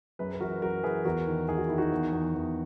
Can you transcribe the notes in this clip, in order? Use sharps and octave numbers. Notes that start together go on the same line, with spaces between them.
F#2 G#4 B4
B4
E3 F#4 A#4
F#2 F#4 A#4
E3 G#4 B4
E2 F#4 A#4
D#3
D#3 G#4
F#4
D#3 E4
D#4 F#4
E2
E2
E2